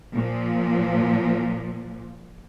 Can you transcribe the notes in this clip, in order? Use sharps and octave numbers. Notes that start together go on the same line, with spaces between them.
A#2 F3